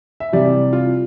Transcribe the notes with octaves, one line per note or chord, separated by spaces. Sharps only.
E5
C3 E3 G3 D5
F4